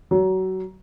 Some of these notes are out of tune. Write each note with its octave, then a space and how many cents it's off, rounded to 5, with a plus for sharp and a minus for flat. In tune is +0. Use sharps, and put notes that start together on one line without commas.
F#3 +25